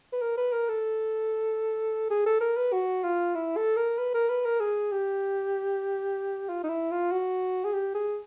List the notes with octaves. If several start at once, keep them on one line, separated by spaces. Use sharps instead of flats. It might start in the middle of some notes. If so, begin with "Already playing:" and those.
B4
A#4
B4
A#4
A4
G#4
A4
A#4
B4
F#4
F4
E4
A4
A#4
B4
A#4
B4
A#4
G#4
G4
F4
D#4
E4
F4
F#4
G#4
G4
G#4